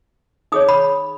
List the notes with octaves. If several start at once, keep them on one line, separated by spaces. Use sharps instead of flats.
D#4 G#4 C#5 D#6
B5